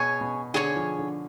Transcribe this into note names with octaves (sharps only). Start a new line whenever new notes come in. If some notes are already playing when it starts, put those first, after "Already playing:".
Already playing: B2 G#4 C#5 G#5 C#6
B2
D3 G#4 C#5 G#5 C#6
F3
D3